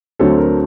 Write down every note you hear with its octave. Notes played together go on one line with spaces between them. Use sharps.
D2 D3 F#3 A3 C4 A4
A#4